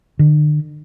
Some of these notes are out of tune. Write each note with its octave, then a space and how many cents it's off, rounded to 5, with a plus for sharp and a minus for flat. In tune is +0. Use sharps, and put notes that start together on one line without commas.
D3 +40